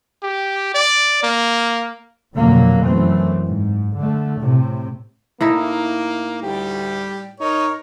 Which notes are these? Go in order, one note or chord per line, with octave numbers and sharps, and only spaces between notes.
G4
D5
A#3
F1 F2 B2 D3 F#3 A#3
F#2 E3 A3 C4
G#2
D3 A3
A2 C3
A2 A#3 D#4 E4
D2 G3 G4
D#4 A#4 C#5